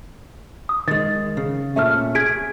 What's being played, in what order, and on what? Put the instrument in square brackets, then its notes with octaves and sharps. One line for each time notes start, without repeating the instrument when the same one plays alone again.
[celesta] D#6
[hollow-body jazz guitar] D#3 G#3 [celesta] A6
[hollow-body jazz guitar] C#3
[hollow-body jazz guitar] A#2 A3 C#4 [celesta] E5 F6
[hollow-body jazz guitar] G#4 [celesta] G#6 B6 D7